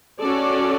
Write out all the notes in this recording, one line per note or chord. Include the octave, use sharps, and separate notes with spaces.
C#4 F#4 A4 D5